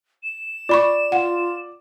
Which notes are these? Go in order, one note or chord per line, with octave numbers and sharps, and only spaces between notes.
E7
F4 D5 B5 C#6
F4 F#5